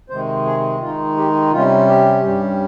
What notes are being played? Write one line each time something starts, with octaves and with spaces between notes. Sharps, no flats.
C3 D#3 G#3 C5
G#4
D#3 G#3 D#4 F4
G4
C3 G3 C#4 F4
G4
G2 G3 C#4